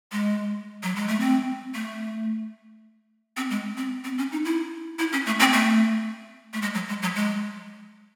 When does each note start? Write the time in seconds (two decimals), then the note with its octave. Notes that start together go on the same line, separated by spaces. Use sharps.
0.12 G#3
0.83 F#3
0.95 G#3
1.08 A3
1.20 C4
1.74 A3
3.37 C4
3.50 G#3
3.77 C4
4.04 C4
4.18 C#4
4.32 D#4
4.45 E4
4.99 E4
5.12 C#4
5.26 A3
5.39 C4
5.53 A3
6.53 A3
6.62 G#3
6.75 F#3
6.88 G#3
7.02 F#3
7.15 G#3